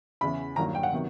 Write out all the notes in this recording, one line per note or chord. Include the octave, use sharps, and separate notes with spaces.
E2 C#3 E3 B5
G2 D#3 F#3 A#3 A#5
G5
F#5
C3 D#3 F#3 B3